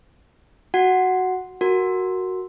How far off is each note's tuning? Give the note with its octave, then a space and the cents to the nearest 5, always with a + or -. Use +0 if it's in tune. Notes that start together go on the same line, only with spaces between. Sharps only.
F#4 +0 F#5 +0
F#4 +0 A#4 +0